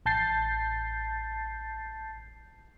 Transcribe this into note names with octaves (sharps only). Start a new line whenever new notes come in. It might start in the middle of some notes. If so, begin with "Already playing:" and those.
A1 A5 G6 A6 C7